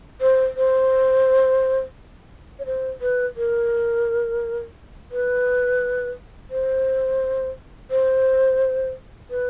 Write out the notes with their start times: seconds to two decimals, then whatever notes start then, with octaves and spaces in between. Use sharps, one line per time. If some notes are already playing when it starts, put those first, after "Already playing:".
0.21 C5
0.57 C5
2.59 C#5
2.66 C5
3.01 B4
3.37 A#4
5.11 B4
6.51 C5
7.91 C5
9.30 B4